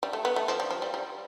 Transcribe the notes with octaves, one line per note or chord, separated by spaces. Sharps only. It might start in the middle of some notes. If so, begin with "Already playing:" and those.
G3
A3
B3
A3
F3
G3
F3
G3
G3